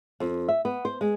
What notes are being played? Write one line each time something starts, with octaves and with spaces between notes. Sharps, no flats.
F2
E5
B3
C5
G#3